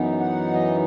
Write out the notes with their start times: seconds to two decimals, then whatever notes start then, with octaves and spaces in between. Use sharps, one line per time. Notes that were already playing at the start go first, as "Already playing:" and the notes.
Already playing: F#2 E3 B3 D#4
0.20 F#5
0.53 D#5